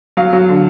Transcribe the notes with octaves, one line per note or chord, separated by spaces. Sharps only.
F#3 F5
F#3
D3